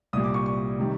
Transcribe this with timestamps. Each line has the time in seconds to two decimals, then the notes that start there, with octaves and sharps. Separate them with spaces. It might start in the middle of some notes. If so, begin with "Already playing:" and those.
0.13 C2 A#2 G3 D#6
0.24 D6
0.34 C#6
0.46 C#6
0.79 C3 D#3 G3